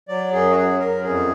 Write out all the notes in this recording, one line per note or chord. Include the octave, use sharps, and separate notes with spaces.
F#3 D5
F#2 G#4
F#4
F#3 G#4
F#2 A#4
F2 G#4